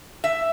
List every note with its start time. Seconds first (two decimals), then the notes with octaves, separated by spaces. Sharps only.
0.24 E5